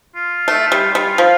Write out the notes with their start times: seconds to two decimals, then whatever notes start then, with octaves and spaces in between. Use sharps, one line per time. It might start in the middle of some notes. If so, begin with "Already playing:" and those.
0.16 F4
0.48 A3
0.72 G3
0.95 G3
1.18 F3